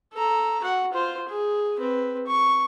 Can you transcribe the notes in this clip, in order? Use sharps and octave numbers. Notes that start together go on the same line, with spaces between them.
A4 A#5
F#4 F#5
F4 C5
G#4
C4 B4
C#6